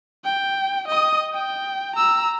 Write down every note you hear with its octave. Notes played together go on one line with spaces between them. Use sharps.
G5
D#5 D#6
G5
A#5 E6